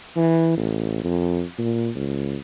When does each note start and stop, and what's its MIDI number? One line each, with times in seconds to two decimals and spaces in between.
0.16 0.53 52
0.57 1.01 33
1.04 1.43 41
1.58 1.89 46
1.95 2.37 37